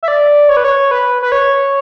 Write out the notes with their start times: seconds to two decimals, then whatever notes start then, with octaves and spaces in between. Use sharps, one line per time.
0.03 E5
0.08 D5
0.49 C#5
0.57 B4
0.64 C#5
0.91 B4
1.22 B4
1.32 C#5